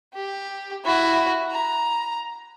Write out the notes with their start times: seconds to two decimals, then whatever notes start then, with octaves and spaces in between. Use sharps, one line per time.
0.14 G4
0.85 E4 F#4
1.51 A#5